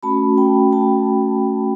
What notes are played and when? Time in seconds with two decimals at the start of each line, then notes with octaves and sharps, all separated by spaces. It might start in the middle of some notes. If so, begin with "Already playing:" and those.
0.03 A3 C#4 F#4 A5 B5
0.37 G5 A5
0.72 A3 C#4 F#4 G5 A5